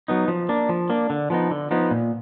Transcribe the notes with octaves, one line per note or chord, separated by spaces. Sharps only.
F#3 B3 D#4
F3
A#3 D4
F3
A#3 D4
D3
F3 B3 D#4
D3
F3 B3 D#4
A#2